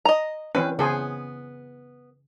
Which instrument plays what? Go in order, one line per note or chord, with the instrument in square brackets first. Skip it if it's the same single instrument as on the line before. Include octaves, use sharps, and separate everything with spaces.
[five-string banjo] D#5 A#5
[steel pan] E3 C4 C#4 [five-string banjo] B4
[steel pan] C#3 G#4 C5 [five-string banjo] B3